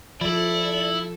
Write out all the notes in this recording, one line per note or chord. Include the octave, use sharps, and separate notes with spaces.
F3 E4 A4 D5